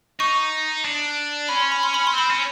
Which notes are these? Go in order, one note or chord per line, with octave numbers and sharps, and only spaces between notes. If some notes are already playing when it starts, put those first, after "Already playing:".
D#4 C#6
D4
C#4 B5
C6
B5
C6
B5
C6
C4
B5
C#4 C6